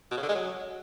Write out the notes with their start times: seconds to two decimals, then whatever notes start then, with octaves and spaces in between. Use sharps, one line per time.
0.11 B2
0.17 C#3
0.23 D3
0.29 G#3
0.35 F#3